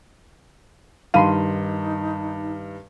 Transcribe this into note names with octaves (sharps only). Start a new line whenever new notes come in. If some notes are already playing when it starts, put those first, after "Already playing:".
G2 D#3 D#4 F5 B5 C6 D#7